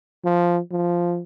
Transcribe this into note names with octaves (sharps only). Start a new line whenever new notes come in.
F3
F3